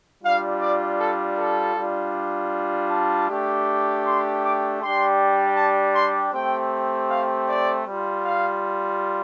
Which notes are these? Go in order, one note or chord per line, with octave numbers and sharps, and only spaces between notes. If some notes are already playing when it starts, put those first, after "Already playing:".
G3 D4 F4 F5
D5
A4
A4
G3 D4 F4
A5
A3 D4 G4
C6
D6
G3 D4 G4 C6
A5
C6
A3 C4 G4 G5
F5
D5
G3 F4
F5